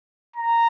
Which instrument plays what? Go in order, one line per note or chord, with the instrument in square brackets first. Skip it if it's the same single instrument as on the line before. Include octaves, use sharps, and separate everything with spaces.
[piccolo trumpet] A#5